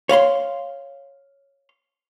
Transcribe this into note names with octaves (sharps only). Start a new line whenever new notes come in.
C#5 F5 B5 C6